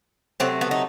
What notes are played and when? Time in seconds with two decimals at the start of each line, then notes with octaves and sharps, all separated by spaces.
0.40 C3 F#3 A3 C4
0.61 B3
0.71 D#4